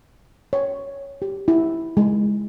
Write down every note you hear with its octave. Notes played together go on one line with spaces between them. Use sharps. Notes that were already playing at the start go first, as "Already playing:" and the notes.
C#5
G4
E4
G#3